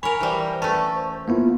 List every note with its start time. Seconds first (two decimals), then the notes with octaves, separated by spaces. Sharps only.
0.03 A#4 C#5 G#5 B5
0.21 E3 G3 C5
0.62 A3 C#4 B4 A5
0.94 C5
1.12 C5
1.28 A#3 B3 E4 F4